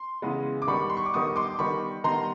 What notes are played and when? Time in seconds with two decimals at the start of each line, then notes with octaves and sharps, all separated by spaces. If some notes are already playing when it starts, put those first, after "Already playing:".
Already playing: C6
0.22 C#3 E3 G#3 B3
0.62 D6
0.67 D#3 G3 B3 B5 C#6
0.90 C6
0.97 C#6
1.06 D6
1.14 D#3 G3 B3 C#6 D#6
1.36 C6 D6
1.59 D#3 G3 B3 B5 C#6
2.04 D#3 G3 B3 A#5 C6